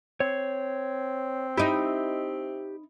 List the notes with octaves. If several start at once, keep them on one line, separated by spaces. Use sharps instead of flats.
C4 C#5
D#4 E4 G4